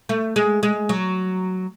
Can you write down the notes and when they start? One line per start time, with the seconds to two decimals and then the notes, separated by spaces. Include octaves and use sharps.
0.09 A3
0.36 G#3
0.63 G#3
0.89 F#3